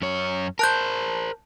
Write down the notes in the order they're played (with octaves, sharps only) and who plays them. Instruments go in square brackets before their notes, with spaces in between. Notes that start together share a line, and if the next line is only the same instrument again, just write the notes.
[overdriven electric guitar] F#2 C#5
[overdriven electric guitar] A#4 C5 [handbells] A5 F#6 G6